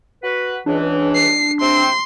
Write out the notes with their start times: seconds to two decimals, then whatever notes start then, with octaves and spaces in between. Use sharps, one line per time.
0.23 F#4 B4
0.66 C#2 E3 D4
1.15 C7
1.61 C3 C4 G5 C6